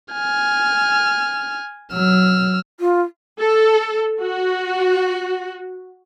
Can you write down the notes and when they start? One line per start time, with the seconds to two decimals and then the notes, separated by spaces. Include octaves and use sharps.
0.13 G#5 F6
1.93 F#3 E6 F6
2.80 F4
3.38 A4
4.20 F#4